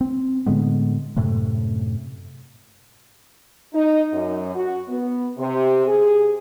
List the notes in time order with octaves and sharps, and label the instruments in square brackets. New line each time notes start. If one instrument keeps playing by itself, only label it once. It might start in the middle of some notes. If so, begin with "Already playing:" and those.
[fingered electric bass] C4
A2 D3 G#3 B3
F#2 A2 C3 A3
[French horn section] D#4
F#2
F#4
B3
C3
G#4